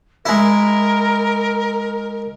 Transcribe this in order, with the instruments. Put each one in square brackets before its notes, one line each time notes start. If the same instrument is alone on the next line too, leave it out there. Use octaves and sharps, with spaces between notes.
[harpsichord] G#3 E4 [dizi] A#4